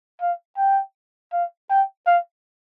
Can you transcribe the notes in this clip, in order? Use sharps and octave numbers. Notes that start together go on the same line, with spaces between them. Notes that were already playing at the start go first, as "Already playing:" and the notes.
F5
G5
F5
G5
F5